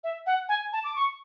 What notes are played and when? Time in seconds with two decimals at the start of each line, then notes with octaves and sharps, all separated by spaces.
0.04 E5
0.26 F#5
0.49 G#5
0.73 A5
0.84 D6
0.96 C#6